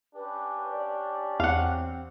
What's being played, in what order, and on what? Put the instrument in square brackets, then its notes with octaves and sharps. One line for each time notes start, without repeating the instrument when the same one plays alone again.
[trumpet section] C#4 D4 G4 [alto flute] B4
[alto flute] D5
[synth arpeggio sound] E2 [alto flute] C4 [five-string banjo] F5 F#5